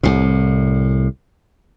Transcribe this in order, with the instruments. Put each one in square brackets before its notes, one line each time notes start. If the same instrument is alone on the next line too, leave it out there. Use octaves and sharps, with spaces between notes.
[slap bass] C2 A2